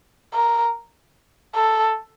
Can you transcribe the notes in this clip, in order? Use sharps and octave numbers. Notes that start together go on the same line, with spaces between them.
A#4
A4